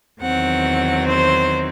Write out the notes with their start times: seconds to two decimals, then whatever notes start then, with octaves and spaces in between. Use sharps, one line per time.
0.21 E2 D#3 F#3 C4 F#5
1.06 C5